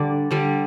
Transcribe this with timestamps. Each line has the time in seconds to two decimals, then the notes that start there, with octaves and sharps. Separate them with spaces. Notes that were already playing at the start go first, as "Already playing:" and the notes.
Already playing: D3 G3 D5
0.31 D3 G3